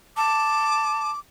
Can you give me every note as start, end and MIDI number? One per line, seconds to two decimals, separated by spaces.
0.17 1.10 81
0.17 1.19 86